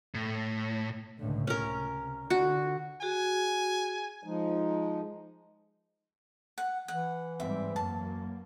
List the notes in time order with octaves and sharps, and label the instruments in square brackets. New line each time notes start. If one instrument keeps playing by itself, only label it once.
[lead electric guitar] A2
[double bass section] C#2 A2 D3
[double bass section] C3 [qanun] C#4 A#4
[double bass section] D3 [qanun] F#4
[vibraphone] F#4 G#4 [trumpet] G#5
[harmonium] F3 G#3 D#4
[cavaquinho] F#5
[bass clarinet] E3 [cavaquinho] F#5
[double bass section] G#2 G3 C4 [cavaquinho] E5
[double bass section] F#2 F#3 A#3 [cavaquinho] A5